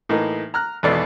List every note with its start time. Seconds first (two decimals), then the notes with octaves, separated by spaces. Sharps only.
0.09 A2 E3 A#3 D#4
0.54 A#5 F6 F#6
0.83 G#1 E2 B2 A4 D5